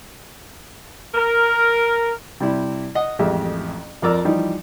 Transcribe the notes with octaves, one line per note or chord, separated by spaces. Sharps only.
A#4
C3 G3 E4
D#5 F#5
A1 F2 G#3 G4 E5
F2 F3 A#4 D5 A#5 E6
E3 F3 G3 D#4